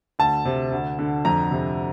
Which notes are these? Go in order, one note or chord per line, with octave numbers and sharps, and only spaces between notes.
D2 A5
C3
D2
D3
F2 A#5
C3